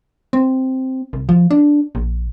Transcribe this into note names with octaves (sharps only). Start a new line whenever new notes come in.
C4
C2
F3
D4
A#1